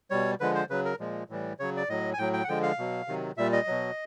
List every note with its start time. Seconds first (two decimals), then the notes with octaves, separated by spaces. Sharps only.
0.10 B2 G3 C#5
0.40 D3 F3 G#3 B4
0.55 C5
0.70 C#3 F#3 B4
0.85 A#4
1.00 A#2 F3 G#3
1.29 A2 E3 G3
1.59 C#3 F#3 C#5
1.77 D5
1.89 A2 F#3 D#5
2.13 G#5
2.18 A2 F#3 G5
2.33 G5
2.44 F#5
2.48 D3 F3 G#3 G5
2.63 F5
2.78 B2 F#3
3.08 C3 D#3 F#3
3.37 A#2 G3 E5
3.52 D#5
3.67 B2 F#3